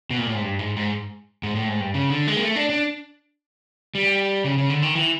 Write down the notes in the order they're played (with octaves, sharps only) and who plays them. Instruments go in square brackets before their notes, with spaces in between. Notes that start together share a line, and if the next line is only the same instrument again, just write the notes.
[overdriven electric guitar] B2
A#2
A2
G#2
G2
G#2
G#2
G#2
A2
G#2
G2
C#3
D3
G#3
A#3
A3
D4
D4
G3
C#3
C#3
D3
D#3
E3